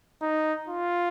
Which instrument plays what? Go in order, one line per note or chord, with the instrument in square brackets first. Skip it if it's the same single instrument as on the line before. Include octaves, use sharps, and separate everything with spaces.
[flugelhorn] D#4
F4